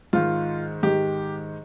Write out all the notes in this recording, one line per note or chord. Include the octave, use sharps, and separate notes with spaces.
G#2 D#3 F4
G#2 D#3 G4